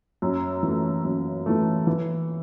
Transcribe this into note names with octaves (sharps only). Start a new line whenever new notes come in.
F#2
E3 A3
F#2
E3 A3
E3